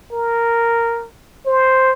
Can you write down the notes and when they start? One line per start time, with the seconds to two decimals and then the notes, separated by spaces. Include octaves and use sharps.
0.12 A#4
1.46 C5